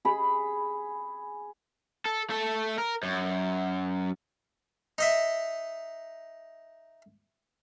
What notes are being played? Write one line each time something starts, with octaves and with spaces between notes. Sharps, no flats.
G#4 B5
A4
A3 A4
A#4
F#2
D#4 D#5 E5